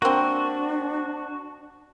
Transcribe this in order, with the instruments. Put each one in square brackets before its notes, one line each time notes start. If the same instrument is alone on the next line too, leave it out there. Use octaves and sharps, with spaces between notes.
[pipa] A#3 C4 [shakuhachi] D4 [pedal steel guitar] F#4